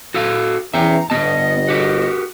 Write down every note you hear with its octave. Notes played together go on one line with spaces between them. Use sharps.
F#4 A4 F5
E2 C#4 E5 G5 A#5
G1 B3 D#5 A5
F#4 G4 A#4